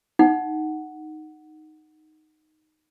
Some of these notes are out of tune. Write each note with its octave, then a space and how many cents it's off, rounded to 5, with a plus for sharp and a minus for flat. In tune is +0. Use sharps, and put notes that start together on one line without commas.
D#4 -5 F#5 +0